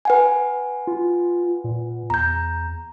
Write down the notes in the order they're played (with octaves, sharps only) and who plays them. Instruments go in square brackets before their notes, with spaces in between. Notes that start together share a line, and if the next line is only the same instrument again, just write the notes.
[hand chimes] B4 F#5 G#5
[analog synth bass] F4
A#2
[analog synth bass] E2 [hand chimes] A#5 G6